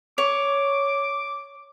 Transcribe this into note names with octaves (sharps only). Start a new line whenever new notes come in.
C#5 D6